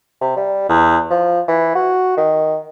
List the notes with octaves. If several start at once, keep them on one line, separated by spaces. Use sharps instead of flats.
C3
G3
E2
F3
E3
F#4
D#3